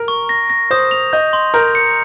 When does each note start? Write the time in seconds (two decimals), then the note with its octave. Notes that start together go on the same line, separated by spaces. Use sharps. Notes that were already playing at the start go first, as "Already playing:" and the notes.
Already playing: A#4
0.08 C#6
0.29 A#6
0.50 A#6
0.71 C5 D#6
0.91 F7
1.13 D#5 G6
1.33 C6
1.54 A#4 G6
1.75 C#7